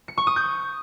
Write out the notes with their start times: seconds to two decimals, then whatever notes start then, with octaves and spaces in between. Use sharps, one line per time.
0.08 C#7
0.18 C#6
0.27 D#6
0.36 G6